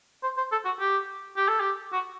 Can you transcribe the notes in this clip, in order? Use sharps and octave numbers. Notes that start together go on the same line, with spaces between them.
C5
C5
A4
F#4
G4
G4
A4
G4
F#4